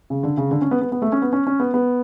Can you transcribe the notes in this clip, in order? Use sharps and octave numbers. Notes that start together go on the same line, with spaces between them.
C#3
D3
C#3
D3
C#4
B3
B3
B3
A3
C#4
B3
C#4
C#4
B3
B3